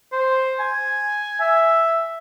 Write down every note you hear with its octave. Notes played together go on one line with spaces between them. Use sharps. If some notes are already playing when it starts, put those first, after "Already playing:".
C5
G#5
E5